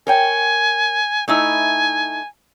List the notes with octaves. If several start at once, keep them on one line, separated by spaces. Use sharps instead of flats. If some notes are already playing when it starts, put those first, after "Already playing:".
A#4 C#5 G5 G#5
A3 D#4 E4 G#5